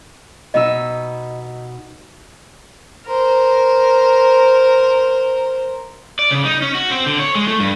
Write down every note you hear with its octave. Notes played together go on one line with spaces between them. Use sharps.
B2 D#4 D#5 E6
A#4 C5
D5
C#3
D#4
C#4
F#4
C4
D3
C#5
G#3
A3
G2